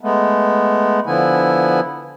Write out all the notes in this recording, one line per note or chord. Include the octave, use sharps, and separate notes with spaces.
G#3 A3 B3
D3 F3 B3 E4 G#5